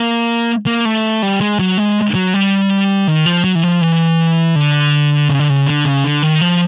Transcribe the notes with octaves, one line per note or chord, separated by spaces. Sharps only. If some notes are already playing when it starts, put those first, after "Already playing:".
Already playing: A#3
A#3
A3
G3
G#3
F#3
G#3
F#3
G3
D#3
F3
F#3
E3
F3
E3
D3
C#3
D3
C#3
D3
C#3
D3
D#3
F3